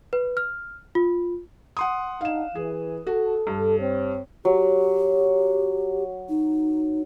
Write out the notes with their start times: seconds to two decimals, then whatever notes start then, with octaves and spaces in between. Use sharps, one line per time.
0.13 B4
0.37 F6
0.95 F4
1.77 F#5 C6 D#6
2.21 D4 D#4 F5 F#5 E7
2.55 E3 G#4
3.07 F#4 A4
3.47 G2
3.79 C4 C#5
4.45 F#3 G4
6.29 D#4